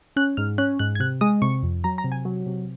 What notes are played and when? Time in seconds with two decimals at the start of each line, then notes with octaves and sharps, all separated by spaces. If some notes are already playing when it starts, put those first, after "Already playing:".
0.16 C#4 F#6
0.37 G#2 F6
0.58 C#4 F#6
0.79 G#2 F#6
0.95 G#6
1.00 C3 F#6
1.21 G#3 D#6
1.42 C3 C#6
1.63 F2
1.84 F#3 A#5
1.98 A#5
2.04 C3
2.12 G#5
2.25 F#3
2.46 C3